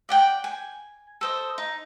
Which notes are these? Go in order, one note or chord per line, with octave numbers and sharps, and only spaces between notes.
D5 F#5 G5
G#5
A4 C5 D#5
D#4